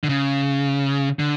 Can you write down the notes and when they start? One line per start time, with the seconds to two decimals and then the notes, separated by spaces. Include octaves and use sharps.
0.04 D3
0.09 C#3
1.19 D3